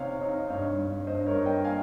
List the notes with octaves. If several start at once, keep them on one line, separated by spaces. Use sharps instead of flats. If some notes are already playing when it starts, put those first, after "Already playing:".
Already playing: C3 C4 D#4 C#5 F5
D#4 C#5 F5
D#5
G2 C#5 F5
G2
G2 C5 D#5
A#4 C#5
G2
D#5 G5
A#3 F5 G#5